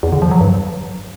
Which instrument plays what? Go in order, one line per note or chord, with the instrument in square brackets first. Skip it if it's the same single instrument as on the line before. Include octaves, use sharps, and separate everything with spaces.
[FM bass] E2
D3
F3
F#3
G2